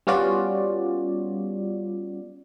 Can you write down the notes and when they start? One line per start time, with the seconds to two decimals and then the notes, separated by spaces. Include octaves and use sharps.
0.07 G3 B3 C#4 F4 F#4 D5